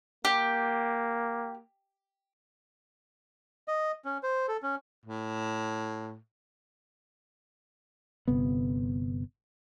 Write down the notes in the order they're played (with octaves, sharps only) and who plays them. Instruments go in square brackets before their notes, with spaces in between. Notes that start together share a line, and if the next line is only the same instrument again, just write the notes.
[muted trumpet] A#3 [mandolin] G4
[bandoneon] D#5
C#4
C5
A4
C#4
[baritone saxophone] A2
[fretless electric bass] G1 C3 B3